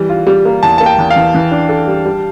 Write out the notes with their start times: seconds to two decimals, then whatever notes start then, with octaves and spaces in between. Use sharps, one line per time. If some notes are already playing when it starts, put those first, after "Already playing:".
Already playing: E3 G3
0.09 F4
0.27 G3
0.45 A#3
0.63 E2 A5
0.78 A#3 A5
0.86 G5
0.98 E2
1.11 F5
1.16 E3
1.34 E3
1.51 D4
1.69 A4
1.87 G3
2.05 G3